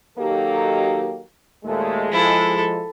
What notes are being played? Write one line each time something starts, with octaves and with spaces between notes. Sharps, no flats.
D#3 F#3 A#3 D#4 G4 A4
D#2 A#2 G#3 A3
F3 E4 A4